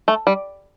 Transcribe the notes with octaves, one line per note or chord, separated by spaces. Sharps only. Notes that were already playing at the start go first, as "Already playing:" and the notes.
A3
G3